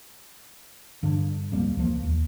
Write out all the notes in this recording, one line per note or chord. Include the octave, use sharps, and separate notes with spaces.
G2 D3
D1 F2 G3 A#3
C#2 F3 A#3
D#2